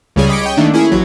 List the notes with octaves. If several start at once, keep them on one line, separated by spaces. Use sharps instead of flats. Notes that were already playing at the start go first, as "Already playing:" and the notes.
C#2 C#3 G3 C#4 G#4
D#5 B5 D6 G#6 C#7 D7
C#5 D#5 G5
D#3 A3 A#3 D4
C#4 E4 G#4
A1 F#3